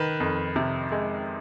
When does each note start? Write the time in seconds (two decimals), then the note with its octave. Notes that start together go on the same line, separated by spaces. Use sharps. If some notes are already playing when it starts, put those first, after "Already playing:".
Already playing: D#3 B4
0.20 F2
0.56 C3
0.92 G#3